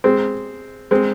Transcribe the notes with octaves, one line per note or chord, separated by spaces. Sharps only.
G#3 C4
G#3 C4